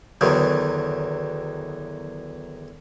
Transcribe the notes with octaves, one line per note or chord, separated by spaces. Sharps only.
E2 D3 D#3 F#3